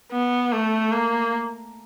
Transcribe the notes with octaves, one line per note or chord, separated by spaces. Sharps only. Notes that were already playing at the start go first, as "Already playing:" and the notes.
B3
A3
A#3